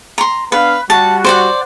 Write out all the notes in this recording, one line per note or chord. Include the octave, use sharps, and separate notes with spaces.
A#5 C6
B3 D4 B4 F5
G3 F#4 A5
C5 D5 F#5